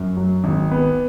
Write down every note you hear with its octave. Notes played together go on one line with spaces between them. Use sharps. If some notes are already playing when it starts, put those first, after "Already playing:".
Already playing: F#2
F#3
G#1
B3